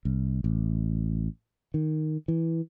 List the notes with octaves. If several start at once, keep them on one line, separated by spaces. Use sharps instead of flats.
C2
A1
D#3
E3